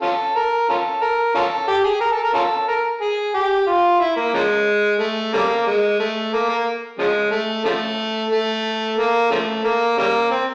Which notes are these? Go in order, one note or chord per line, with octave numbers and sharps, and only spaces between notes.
C#4 F4 A4
A#4
C#4 F4 A4
A#4
C#4 F4 A4
G4
G#4
A#4
A4
A#4
C#4 F4 A4
A#4
G#4
G4
F4
E4
A#3
C#3 F3 G#3
A3
C#3 G3 A#3
G#3
A3
A#3
A#3
C#3 F3 G#3
A3
C#3 F3 A3
A3
A#3
C#3 F3 A3
A#3
C#3 G3 A#3
C4